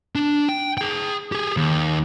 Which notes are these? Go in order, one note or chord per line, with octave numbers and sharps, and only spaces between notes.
D4
G5
G#4 G5
G4 G#4
D#2